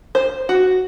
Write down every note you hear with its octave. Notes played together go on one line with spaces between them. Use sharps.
C5
F#4